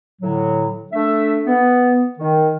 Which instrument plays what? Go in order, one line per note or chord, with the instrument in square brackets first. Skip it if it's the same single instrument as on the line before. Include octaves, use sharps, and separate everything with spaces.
[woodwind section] A2 D3 F#3
A3 D4 E5
B3
D#3